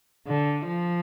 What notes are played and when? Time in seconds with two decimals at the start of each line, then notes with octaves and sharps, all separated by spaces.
0.27 D3
0.67 F3